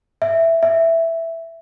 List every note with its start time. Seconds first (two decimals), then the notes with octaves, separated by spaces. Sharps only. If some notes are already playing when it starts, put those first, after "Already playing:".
0.22 E5
0.63 E5